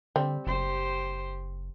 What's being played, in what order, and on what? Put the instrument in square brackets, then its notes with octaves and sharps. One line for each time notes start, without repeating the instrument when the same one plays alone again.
[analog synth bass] D3 [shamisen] G3 C4
[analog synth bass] F#1 [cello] G4 C5